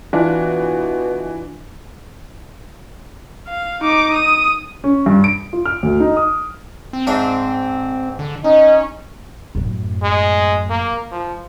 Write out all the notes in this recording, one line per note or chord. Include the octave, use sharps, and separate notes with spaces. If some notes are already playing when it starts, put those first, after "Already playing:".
B2 E3 D4 F4
F5
D#4 D6
D#6
C#4
G2
D7
F4
F6
D2
D#4
D#6
C4
G#2 D4 E5
D3
C#4 D#4
F#2 A2
G#3
A#3
F3